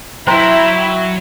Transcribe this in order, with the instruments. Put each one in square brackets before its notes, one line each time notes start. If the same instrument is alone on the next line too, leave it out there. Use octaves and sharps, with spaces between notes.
[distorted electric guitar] F#3 [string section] E4 [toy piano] C5 A#5 C6 [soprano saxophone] G5